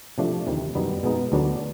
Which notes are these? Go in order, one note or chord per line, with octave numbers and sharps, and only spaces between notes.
C3 F3 A3 D4
D2 C3 D#3
F#2 D#3 G3 B3 D#4
B2 G#3 B3 D#4
D2 D3 F#3 B3 D4